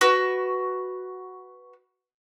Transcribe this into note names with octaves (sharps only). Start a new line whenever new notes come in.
F#4 B4 C#6